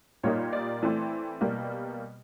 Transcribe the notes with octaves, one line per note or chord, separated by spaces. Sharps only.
A#2 G3 A#3 D#4 C#5
D5
E3 A3 C4 E4
B2 G3 A#3